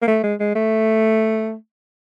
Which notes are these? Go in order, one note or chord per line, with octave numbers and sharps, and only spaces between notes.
A#3
A3
G#3
G#3
A3